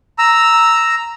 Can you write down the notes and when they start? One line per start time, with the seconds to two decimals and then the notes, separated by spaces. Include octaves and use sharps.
0.19 A#5 E6